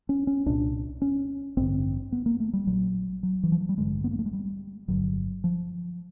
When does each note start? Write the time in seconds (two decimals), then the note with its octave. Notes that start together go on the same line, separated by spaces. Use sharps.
0.09 C#4
0.27 C#4
0.46 C2 A#2 D4
1.02 C#4
1.57 A1 G2 D3 C4
2.12 B3
2.26 A#3
2.40 A3
2.53 G3
2.67 A#1 A#2 F#3
3.23 F#3
3.43 E3
3.52 F3
3.61 F#3
3.69 G3
3.77 A1 G2 D3 G#3
4.04 B3
4.11 A#3
4.19 A3
4.26 G#3
4.33 G3
4.88 G1 G2 D3 F#3
5.44 F3